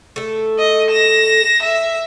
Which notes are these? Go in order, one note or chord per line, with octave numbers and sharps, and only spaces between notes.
A3 A4
D#5
A#6 E7
E5